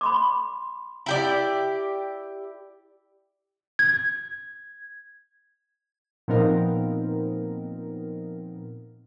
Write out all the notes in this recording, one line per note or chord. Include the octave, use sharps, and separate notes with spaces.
B5 C6 D6
E4 G4 D5
G#6
A#2 F3 B3 C4 D#4 A#4